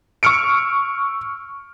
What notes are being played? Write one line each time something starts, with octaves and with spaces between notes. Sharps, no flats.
C#6 E6 F6 C#7 D7